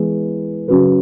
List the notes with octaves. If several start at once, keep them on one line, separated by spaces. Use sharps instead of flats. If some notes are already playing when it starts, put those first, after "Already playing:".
Already playing: E3 G#3 B3 G#4
C#3 F#3 C#4 F#4 B4